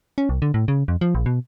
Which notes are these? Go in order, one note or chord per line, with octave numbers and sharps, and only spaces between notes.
C#4
C2
D3
A2
C#3
F2
F3
A#1
B2